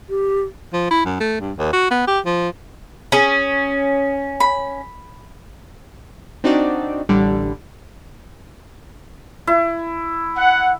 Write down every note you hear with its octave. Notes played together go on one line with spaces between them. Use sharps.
G4
F3
E4
F#2
A3
G2
D#2
F#4
B3
G4
F3
C#4 G#4
B5
C4 D4 D#4 F#4 D5
A1 D3 G3
E4
F#5